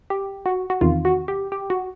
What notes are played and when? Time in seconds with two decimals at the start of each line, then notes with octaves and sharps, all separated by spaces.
0.10 G4
0.46 F#4
0.70 F#4
0.81 E2 C3 D#3 F4
1.05 F#4
1.28 G4
1.52 G4
1.70 F#4